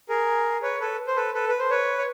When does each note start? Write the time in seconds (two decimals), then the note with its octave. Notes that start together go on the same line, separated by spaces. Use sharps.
0.09 G#4 A#4
0.63 B4 C#5
0.80 A4 B4
1.07 C5
1.16 A4 B4
1.34 A4 B4
1.49 B4
1.59 C5
1.70 B4 C#5
1.98 C#5